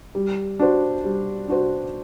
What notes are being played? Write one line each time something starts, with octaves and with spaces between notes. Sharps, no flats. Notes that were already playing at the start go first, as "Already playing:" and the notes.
G3
D4 F#4 C5
G3
D4 F#4 C5